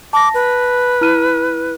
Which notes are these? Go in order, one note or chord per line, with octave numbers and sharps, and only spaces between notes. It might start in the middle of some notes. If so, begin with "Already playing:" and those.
A5 D6 A#6
B4
E4 F6 D#7